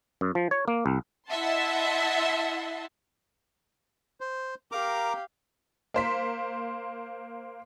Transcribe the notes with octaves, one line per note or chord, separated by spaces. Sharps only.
F#2
F3
C#5
A#3
C2
E4 D#5 E5 F#5 A5 C6
C5
G4 A#4 F5 A#5 D6
A#3 C5 B6